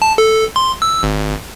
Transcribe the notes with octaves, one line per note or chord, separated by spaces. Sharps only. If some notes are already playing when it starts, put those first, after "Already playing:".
A5
A4
C6
E6
G#1